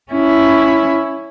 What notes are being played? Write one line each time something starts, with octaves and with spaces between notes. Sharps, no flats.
C#4 E4